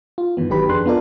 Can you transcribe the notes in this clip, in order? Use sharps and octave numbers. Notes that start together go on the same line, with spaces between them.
F4
G2 D#3 E3 B3
G1 D#3 F#3 G4 B4 B5
F2 D4 G#4 C6 F#6
B3 D4 F4 A4 A#4 D5